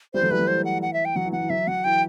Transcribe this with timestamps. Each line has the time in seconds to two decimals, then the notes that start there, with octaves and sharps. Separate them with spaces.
0.14 E3 G3 C5
0.22 F#3 A3
0.31 E3 G3 B4
0.39 F#3
0.47 E3 C5
0.65 F#5
0.82 F#5
0.93 E5
1.05 G5
1.16 F#3 F#5
1.25 E3
1.33 F#3 F#5
1.41 E3
1.50 F#3 E5
1.67 F#3 F#5
1.84 E3 G5